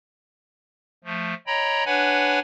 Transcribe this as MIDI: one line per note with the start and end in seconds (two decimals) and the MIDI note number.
1.04 1.34 53
1.04 1.34 57
1.47 1.84 73
1.47 1.84 75
1.47 1.84 79
1.47 1.84 82
1.47 1.84 83
1.86 2.39 62
1.86 2.39 71
1.86 2.39 73
1.86 2.39 78
1.86 2.39 80
1.86 2.39 83